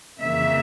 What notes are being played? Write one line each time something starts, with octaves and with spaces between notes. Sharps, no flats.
F2 C#3 E3 A#3 E5